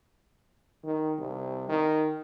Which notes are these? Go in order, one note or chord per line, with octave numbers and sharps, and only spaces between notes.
D#3
C2
D#3